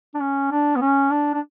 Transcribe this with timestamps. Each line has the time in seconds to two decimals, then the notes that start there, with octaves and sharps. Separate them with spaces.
0.14 D4
0.20 C#4
0.51 D4
0.76 B3
0.81 C#4
1.11 D4
1.34 D4